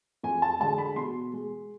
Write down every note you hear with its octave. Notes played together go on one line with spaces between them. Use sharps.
F2 G#5
A5
D3 G#3 A5
B5
B2 C6
G#3